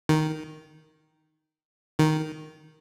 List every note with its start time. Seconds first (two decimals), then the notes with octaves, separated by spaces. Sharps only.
0.09 D#3
1.99 D#3